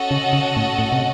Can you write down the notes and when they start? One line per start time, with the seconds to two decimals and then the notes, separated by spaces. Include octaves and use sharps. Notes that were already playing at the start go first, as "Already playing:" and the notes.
Already playing: C#4 F#4 A4 D#5 F#5
0.11 C#3
0.33 C#3
0.57 A2
0.79 A2
0.92 C3